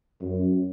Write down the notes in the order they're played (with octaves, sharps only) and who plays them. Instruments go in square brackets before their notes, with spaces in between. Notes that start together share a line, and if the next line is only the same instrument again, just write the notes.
[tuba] F#2